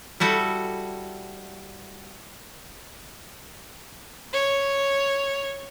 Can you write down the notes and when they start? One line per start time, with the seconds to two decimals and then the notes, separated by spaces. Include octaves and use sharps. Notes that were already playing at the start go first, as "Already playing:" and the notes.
0.20 G3 E4 F#4 A4
4.33 C#5